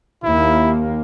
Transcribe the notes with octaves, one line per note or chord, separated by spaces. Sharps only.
D#2 A#3 E4